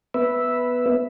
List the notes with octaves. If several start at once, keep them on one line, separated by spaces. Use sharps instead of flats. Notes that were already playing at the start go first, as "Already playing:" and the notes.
B3 B4 E5